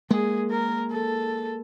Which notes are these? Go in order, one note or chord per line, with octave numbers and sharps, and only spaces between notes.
G#3 A#3 G#4
A#4
A4